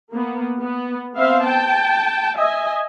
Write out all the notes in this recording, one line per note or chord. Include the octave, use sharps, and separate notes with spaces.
A#3 B3
B3
B3 C4 C5 E5 F5
G5 A5
D#5 E5 G#5